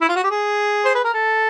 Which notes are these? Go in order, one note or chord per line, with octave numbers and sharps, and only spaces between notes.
E4
F4
F#4
G4
G#4
C5
B4
A#4
A4